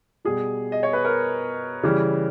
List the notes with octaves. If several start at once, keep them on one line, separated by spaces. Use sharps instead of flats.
B2 G3 G#4
D#5
C#5
B4
A#4
C#3 E3 G3